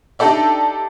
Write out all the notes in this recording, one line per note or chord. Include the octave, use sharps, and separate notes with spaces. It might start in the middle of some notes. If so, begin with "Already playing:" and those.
D4 D#4 G4 A4 D5 E5